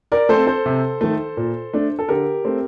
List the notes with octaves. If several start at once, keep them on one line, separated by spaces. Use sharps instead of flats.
A#4 D5
A3 C4 A4 C5
A4 C5
C3
D#3 A3
A#2
A3 D4
A4
D3 G4 A#4
A3 C4